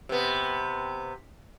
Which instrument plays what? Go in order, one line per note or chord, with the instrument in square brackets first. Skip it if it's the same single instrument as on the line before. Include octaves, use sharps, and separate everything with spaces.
[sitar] C3 B3